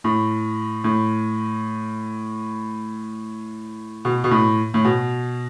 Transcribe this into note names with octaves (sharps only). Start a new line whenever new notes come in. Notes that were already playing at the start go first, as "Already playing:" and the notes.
A2
A2
B2
B2
A2
A2
B2